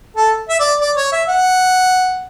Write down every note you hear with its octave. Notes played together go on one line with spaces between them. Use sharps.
A4
E5
D5
D5
C#5
E5
F#5